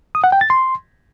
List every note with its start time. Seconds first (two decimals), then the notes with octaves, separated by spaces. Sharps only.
0.15 D#6
0.24 F#5
0.32 G5
0.41 A6
0.50 C6